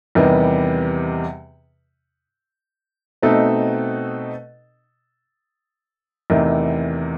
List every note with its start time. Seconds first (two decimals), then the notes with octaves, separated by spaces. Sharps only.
0.15 E2 C3 D#3 G3 B3
3.22 B2 A3 C4 D#4 A4
6.30 E2 C3 D#3 A3